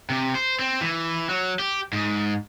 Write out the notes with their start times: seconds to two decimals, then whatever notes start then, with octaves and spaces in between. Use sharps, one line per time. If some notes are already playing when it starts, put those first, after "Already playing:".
0.10 C3
0.35 C5
0.59 C4
0.81 E3
1.29 F#3
1.59 G4
1.93 G#2